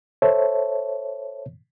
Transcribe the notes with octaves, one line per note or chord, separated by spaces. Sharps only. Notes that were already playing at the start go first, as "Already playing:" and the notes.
A4 C5 C#5 E5 A5